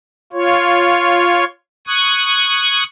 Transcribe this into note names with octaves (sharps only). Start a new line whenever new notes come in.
F4 C#5
C#6 D#6 F#6 G#6